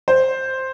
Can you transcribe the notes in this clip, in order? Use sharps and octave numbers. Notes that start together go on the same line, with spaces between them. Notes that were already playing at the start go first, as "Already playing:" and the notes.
C5